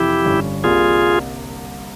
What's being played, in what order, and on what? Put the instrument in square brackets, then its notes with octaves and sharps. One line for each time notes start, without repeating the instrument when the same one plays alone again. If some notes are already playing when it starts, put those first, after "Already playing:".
Already playing: [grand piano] F2 C3 E3 [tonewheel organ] E4 G4
[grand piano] G1 G2 G3 C#4
[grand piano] C2 C3 G3 A#3 [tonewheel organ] F4 G#4